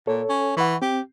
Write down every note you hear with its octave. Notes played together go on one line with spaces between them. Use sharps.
A#2 A4 C#5
C#4
E3 F#5 B5 C#6
C4 G4